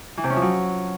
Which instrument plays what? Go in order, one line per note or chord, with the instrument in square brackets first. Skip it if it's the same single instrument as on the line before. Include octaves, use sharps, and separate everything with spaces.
[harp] E3
C3
C#4
F3
F#3